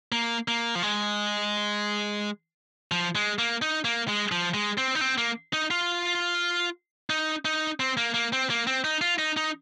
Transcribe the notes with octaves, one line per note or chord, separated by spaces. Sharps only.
A#3
A#3
F3
G#3
F3
G#3
A#3
D#4
A#3
G#3
F3
G#3
C4
D#4
C4
A#3
D#4
F4
D#4
D#4
C4
A#3
A#3
C4
A#3
C4
D#4
F4
D#4
D#4